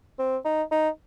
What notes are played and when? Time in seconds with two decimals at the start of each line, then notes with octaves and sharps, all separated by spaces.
0.19 C4
0.45 D#4
0.71 D#4